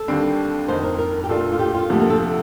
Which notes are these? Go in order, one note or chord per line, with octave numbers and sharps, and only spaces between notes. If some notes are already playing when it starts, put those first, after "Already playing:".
Already playing: A4
D#2 D3 G3 C4
F2 D#3 A#3 D#4 C5
A#4
A#4
G4
A#2 A3 D4 F4 A4
F4
G4
F4
D2 C3 F3 A3
A#3
A4
A4